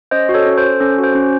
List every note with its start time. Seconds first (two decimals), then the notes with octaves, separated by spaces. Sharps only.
0.11 C#4 C5 D#5
0.29 F#4
0.34 A4 C#5
0.46 C#4
0.58 C5
0.64 A4
0.80 C#4 A4
0.98 F#4
1.04 C5
1.15 C#4